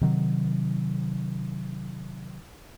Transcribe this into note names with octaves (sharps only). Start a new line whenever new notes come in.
C3 D#3 F#3